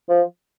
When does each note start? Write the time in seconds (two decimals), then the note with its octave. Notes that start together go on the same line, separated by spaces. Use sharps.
0.09 F3